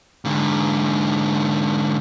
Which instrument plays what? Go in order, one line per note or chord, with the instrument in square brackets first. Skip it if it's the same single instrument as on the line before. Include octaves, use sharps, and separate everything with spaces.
[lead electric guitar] G#2 D3